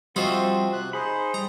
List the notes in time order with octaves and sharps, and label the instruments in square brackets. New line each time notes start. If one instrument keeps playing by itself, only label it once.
[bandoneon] F3 C4 [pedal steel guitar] G3 C5 E5 [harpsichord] F4 F#4 D#5
[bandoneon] C3 F#6
[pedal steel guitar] D#4 B5 [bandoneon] G#4 C5
[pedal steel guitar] G3 [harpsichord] A#5